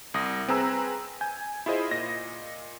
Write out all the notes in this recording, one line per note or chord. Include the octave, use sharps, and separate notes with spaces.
C2 D#6 A#6
C4 G#4 B4 G#5 A#5 E6
G#5 G6
E4 F4 G#4 C5 D#5
A#2 D#5 A#6